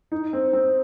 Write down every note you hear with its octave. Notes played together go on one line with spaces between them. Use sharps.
D#4
C4
C4